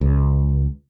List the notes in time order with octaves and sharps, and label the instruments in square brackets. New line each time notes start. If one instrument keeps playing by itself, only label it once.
[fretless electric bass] C#2